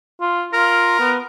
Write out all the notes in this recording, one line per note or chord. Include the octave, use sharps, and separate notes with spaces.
F4
F4 A#4
B3